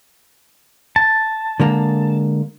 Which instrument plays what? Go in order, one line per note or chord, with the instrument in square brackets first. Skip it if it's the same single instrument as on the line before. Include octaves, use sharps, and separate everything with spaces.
[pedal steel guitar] A5
[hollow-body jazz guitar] D3 G#3 A#3